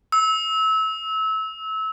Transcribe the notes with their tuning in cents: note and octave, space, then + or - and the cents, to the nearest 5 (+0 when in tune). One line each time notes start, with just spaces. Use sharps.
E6 -25